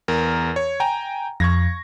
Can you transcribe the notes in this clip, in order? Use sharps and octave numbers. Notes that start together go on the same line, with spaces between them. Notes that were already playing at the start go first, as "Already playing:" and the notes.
E2 A#4
C#5
G5 G#5 A#5
F2 C#6 G#6 A#6